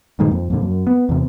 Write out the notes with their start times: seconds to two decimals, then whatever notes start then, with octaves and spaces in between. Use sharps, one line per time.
0.19 G2 A#2 D#3 G#3
0.31 F2
0.50 F2 A#2 D3
0.62 F#2
0.87 B3
1.09 E2 C3